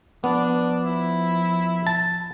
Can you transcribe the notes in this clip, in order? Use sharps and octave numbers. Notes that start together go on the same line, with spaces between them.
F3 B3 D4
E4
A5